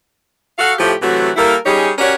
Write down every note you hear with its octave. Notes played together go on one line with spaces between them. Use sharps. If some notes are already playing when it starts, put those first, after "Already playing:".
F#4 A4 F5
A2 F3 A3 G4
C3 E3 F#3 A3 F#4
G3 A#3 E4 A4 A#4
G3 C#4 D#4 G4 G#4 C#5
C#4 F#4 G4 A#4 C#5 D5